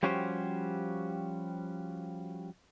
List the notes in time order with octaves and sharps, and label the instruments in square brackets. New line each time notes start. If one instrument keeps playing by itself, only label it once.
[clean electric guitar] F3 G3 C#4 F#4 G4 C5